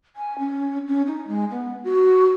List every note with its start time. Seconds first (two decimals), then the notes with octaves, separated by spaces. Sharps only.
0.16 G#5
0.39 C#4
0.87 C#4
1.07 D#4
1.27 G#3
1.51 B3
1.84 F#4